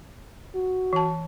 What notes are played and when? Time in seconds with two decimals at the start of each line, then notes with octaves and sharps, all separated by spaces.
0.55 F#4
0.93 E3 A5